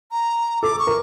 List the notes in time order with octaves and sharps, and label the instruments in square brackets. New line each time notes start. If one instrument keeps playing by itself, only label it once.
[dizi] A#5
[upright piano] A4 [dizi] D6
[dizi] C#6
[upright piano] A#4